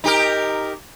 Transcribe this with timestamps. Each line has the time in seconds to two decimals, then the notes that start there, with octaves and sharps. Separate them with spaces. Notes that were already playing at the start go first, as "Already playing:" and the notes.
0.04 D#4 G4 A#4